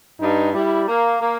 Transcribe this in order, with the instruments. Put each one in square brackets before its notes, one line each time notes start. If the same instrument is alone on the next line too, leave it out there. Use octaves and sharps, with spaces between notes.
[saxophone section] G2 [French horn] D#4
[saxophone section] G3 [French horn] E4
[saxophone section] A#3
A#3